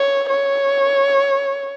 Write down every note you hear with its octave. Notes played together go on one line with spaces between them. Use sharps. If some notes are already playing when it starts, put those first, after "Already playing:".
Already playing: C#5
C#5